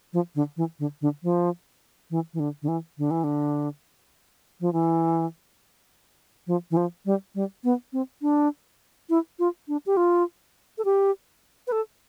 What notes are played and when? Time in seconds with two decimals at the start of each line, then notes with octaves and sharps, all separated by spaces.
0.13 F3
0.35 D3
0.57 E3
0.79 D3
1.01 D3
1.23 F3
2.10 E3
2.34 E3
2.40 D3
2.62 D3
2.68 E3
2.98 D3
3.11 E3
3.24 D3
4.61 F3
4.73 E3
6.47 F3
6.71 E3
6.77 F3
7.06 G3
7.35 G3
7.64 B3
7.93 C4
8.22 D4
9.10 E4
9.39 F4
9.68 D4
9.86 G4
9.97 F4
10.78 A4
10.85 G4
11.67 B4
11.72 A4